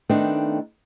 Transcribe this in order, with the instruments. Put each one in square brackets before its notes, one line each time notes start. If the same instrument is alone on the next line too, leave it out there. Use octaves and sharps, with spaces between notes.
[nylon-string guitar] D#3 A3 B3 C4 D4 D#4